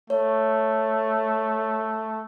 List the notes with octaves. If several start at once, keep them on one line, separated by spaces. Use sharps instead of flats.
A3 C#5